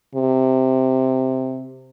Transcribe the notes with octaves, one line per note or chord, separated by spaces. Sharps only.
C3